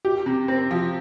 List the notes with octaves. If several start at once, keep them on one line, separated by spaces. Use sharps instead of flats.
G4
C3
C4
F3